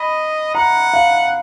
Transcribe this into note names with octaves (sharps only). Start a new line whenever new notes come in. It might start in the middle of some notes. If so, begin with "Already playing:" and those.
Already playing: D#5 B5
F#5 A#5
F5